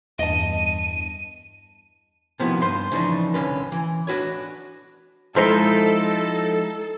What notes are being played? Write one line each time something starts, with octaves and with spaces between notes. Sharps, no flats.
E2 G2 D#5 A5 D#7
C3 D#3 F3 B3 E4 F#4
G2 B4 C5 C6
C#3 E3 F3 D4 D#4
C2 D3 C#4 B4
E3
D4 F#4 B4 C#5
F3 G#3 D#4 E4 A4 C5 E5 C6